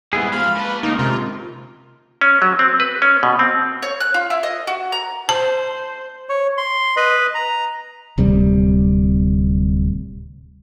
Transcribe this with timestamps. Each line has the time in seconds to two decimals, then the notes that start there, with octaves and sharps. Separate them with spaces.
0.13 G#2 G3 B3 E4 G#4
0.32 G#2 F3 F5 B5
0.57 A#3 B4 A5
0.83 C#2 A#3 D#4 A#4
0.99 C3 F4
2.21 C#4
2.42 F#3
2.59 C4
2.80 B4
3.02 C#4
3.23 B2
3.39 C4
3.82 C#5
4.00 F#6
4.14 F4
4.30 E4
4.43 D#5
4.67 F#4
4.92 A#5
5.29 C5 A5
6.29 C#5
6.58 C6
6.97 B4 D#5 B5
7.35 A#5
8.18 D1 C3 G3